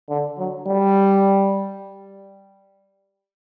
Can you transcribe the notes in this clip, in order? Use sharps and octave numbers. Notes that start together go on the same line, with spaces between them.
D3
F#3
G3